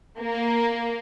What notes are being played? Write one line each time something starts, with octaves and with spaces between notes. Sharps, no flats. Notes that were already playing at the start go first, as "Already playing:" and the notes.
A#3